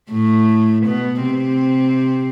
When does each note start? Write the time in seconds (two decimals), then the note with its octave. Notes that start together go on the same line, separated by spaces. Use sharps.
0.11 A2 A3
0.86 B2 B3
1.23 C3 C4